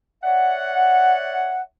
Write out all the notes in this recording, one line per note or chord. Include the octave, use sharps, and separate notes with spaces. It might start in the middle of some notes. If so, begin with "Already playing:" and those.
C#5 D5 E5 F#5